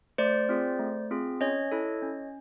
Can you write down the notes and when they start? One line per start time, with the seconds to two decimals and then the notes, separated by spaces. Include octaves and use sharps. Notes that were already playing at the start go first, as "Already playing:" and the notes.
0.18 A3 C5 D5
0.49 C4 F4 G#4
0.79 A3
1.11 C4 F4 G#4
1.41 C#4 C#5 D#5
1.72 E4 A4
2.02 C#4